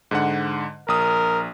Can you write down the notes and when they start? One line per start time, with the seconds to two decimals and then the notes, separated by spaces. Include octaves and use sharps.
0.11 G#2 D3 F#5
0.88 A#1 A#4 D#6